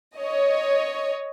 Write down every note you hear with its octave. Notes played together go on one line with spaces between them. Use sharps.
C#5 D#5